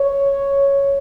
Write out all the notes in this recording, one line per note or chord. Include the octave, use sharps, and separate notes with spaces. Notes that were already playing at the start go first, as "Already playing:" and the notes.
Already playing: C#5